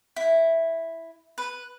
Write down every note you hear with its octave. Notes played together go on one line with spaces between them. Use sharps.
E4
B4